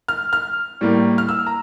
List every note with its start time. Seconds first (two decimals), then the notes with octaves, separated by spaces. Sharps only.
0.08 F6
0.33 F6
0.81 A2 G3 A#3
1.18 F6
1.29 E6
1.47 A#5